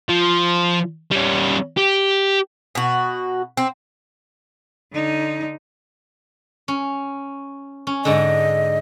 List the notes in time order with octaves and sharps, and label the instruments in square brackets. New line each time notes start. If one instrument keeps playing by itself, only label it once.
[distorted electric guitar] F3
G3 C#4
G4
[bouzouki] B2 F#4
C4
[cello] D3 D#4
[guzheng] C#4
C#4
[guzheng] G#2 D3 [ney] D#5